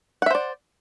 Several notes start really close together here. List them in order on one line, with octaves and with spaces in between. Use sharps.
F#5 E5 C5 D5